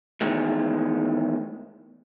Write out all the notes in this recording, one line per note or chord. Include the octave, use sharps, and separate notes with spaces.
E2 D#3 G#3 A3